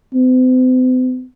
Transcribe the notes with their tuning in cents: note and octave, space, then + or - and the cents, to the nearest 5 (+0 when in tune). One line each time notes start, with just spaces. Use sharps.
C4 -45